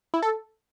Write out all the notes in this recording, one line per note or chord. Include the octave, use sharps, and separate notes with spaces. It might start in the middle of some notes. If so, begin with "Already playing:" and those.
E4
A4